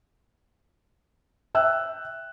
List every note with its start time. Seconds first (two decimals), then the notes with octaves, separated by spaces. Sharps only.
1.55 E5 G5 E6 F#6